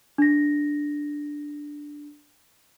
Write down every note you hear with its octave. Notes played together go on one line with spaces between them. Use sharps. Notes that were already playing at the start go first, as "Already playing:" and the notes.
D4 A#6